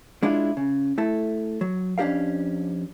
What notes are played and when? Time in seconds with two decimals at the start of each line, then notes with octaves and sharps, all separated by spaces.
0.23 G#3 D4 E4 F4
0.57 C#3
0.98 A3 E4 A4
1.61 F#3
1.98 F2 C#4 D4 G4 A#4 F5